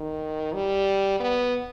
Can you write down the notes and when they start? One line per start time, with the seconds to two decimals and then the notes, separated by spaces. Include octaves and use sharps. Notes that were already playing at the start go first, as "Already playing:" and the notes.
Already playing: D#3
0.54 G3
1.20 B3